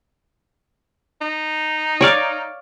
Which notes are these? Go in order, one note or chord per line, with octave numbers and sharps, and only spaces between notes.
D#4
C#5 D5 F5